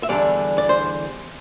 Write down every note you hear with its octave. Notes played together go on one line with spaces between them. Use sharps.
E5
E2 D3 G3 D4 D5
D5
C5